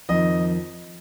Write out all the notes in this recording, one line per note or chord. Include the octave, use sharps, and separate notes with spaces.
F2 D#3 D#5